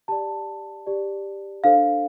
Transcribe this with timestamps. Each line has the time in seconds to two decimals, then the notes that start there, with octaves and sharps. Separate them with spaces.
0.08 G4 D5 A5
0.86 G4 D5
1.64 D4 A4 C5 F5